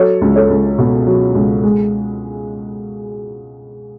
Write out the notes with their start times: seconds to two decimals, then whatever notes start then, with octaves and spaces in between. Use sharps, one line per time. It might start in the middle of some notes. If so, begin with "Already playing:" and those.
Already playing: F#3 A4 C#5
0.21 C#2
0.36 A4 C#5
0.50 C#2
0.78 B2
1.07 F#3
1.35 C#2
1.63 G#3